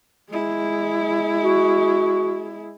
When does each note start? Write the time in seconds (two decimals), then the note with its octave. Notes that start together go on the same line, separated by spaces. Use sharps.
0.31 G#3 E4
1.42 F#4